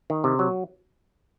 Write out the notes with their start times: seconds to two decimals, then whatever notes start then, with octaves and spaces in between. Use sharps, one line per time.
0.10 D#3
0.24 C3
0.39 F#3